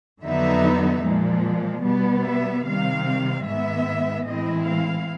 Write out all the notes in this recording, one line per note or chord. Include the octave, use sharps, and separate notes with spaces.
F2 D3 F#3 B3 D#4 E5
A#2 F3 G#3
B2 G3 B3
E5
C3 D#3 G3 C4 F5
G#2 D#3 G#3 B3 E5
A2 E3 G#3 C4 E4 D#5
F5